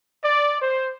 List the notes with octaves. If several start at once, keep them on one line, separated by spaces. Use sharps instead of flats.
D5
C5